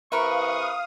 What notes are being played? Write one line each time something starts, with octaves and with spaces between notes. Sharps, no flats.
C3 E3 A#4 B4 E5 F5 C#6 D#6